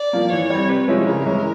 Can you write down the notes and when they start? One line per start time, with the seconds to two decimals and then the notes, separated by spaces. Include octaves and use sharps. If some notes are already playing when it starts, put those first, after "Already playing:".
Already playing: D5
0.13 F3 A#3
0.32 E3 C#5
0.50 G3 C4
0.69 C3 B4
0.88 F3 G#3 C#4 E4
1.07 C#3 A#4
1.26 E3 G#3 C#4 E4